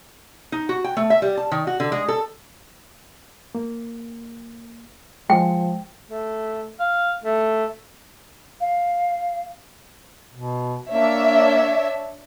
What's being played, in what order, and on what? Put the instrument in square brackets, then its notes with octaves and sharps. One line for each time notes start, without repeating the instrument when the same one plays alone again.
[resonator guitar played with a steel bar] D#4
F#4
G5
A3
E5
G3
A5
D#3
F#4
D3
G#3
A4
[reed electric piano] A#3
[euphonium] F3 [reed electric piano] G#3 [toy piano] G5
[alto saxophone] A3
F5
A3
[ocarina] F5
[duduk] B2
[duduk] A#3 [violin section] D4 C#5 E5